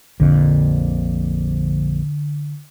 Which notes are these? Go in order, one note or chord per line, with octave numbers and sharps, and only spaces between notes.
A#1 F2 A#2 D3